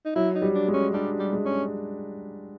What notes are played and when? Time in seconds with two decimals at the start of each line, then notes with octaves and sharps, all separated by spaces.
0.05 D#4
0.16 F#3 E4
0.35 D#4
0.42 G3
0.55 D4
0.68 G#3
0.74 C#4
0.93 G3 D4
1.19 G3
1.33 G#3
1.46 C#4